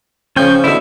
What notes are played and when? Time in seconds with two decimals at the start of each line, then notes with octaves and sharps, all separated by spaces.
0.36 C#3 F3 C#4 G5
0.64 B2 D3 E4 E5